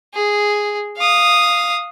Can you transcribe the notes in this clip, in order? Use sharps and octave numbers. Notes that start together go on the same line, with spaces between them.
G#4
F5 D#6